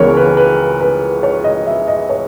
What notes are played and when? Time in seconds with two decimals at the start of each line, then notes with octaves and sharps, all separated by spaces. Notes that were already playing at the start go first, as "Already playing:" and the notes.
Already playing: C#2 C#3 E3 B3 A#4 C#5
0.17 B4
0.37 B4
0.81 B4
1.23 C#5
1.44 D#5
1.67 E5
1.88 D#5
2.09 C#5